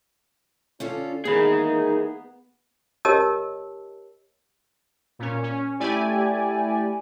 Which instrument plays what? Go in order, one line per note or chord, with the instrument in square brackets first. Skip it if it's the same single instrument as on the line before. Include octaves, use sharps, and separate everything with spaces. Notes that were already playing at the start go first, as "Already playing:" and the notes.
[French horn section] D3 D4 [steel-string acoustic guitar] C#4 F4 A4
[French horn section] E3 G#3 A#3 [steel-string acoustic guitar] B3 [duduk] D#4 [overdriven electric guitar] G#4 B5
[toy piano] G4 A#4 C#5 D#5 A5 E6
[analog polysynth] A#2 C#4
C#4
A3 E4 G4 D5 G#5